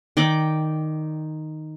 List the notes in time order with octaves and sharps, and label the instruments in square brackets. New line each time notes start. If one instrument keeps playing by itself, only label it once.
[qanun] D#3 D5 G5 D6